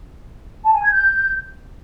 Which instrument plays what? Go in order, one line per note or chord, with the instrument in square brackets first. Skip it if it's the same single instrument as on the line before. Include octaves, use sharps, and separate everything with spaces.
[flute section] A5
G#5
G#6
G6